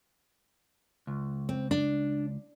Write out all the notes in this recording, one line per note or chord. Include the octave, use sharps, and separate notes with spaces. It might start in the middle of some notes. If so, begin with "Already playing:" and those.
C#2
C4
D4